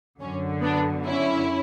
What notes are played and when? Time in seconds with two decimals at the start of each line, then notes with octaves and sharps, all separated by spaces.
0.20 F#2 D3 C#4
0.62 B3 D4
1.06 C#4 E4